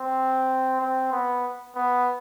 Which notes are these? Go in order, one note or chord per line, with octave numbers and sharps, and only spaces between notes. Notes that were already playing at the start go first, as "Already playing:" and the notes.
Already playing: C4
C4
B3
B3